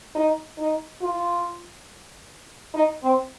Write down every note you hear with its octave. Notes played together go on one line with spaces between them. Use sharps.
D#4
D#4
F4
D#4
C4